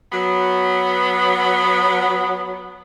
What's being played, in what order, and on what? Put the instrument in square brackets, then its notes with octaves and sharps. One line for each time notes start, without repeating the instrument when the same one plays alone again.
[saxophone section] F#3 B3